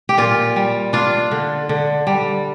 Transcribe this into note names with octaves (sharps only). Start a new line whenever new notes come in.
G4
A#2 F4
G3
D4 F4
D3
D3
G3